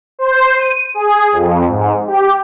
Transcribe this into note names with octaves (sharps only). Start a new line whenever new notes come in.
C5
D#7
G#4
F2
G#2
G4